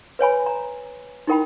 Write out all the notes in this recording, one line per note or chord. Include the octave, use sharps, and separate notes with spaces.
B4 C#5 G#5 B5
A#5
D#4 E4 A#4 G5 B5